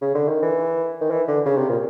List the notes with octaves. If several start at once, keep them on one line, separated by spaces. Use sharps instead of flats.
C#3
D3
D#3
E3
D#3
E3
D3
C#3
C3
A#2